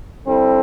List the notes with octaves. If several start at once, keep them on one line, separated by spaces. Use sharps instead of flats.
D3 G3 C4 E4 A4